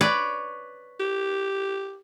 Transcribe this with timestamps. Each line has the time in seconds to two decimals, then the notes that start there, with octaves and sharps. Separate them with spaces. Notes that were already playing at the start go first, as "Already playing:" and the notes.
0.01 B4 C#5 D5
1.00 G4